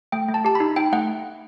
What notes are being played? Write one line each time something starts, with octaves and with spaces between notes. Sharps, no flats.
A3 G5
A3
A5
G4 A5
B5
D#4
D#4 G5
A3 F#5